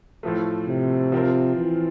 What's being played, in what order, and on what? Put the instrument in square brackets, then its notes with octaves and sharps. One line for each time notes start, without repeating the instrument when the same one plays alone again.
[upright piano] A2 F3 A3
[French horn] C3
[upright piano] F3 C4 F4 A#4
[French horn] E3